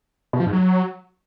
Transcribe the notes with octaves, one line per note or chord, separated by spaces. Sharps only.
B2
F3
G#2
F#3